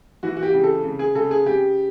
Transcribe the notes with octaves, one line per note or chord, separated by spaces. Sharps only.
E3 F#4
F#4
G4
C#3
A4
C#3
G#4
C#3 A4
G#4
C#3 G4